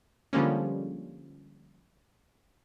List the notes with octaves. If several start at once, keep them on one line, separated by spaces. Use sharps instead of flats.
D3 F3 G3 G#3 A#3 C#4